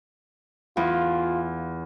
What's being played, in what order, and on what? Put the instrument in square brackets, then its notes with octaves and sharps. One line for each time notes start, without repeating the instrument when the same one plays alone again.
[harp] E2 [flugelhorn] F4